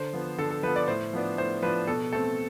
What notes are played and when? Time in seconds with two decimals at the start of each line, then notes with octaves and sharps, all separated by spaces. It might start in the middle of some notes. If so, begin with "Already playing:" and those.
Already playing: D3 C5
0.13 F3 B3
0.38 D3 A4
0.51 A4
0.63 F3 B4
0.68 B3
0.76 D5
0.88 A2 C5
1.13 F3 B3 D4
1.38 A2 C5
1.62 F3 B3 D4 B4
1.88 B2 A4
2.12 A3 C4 A4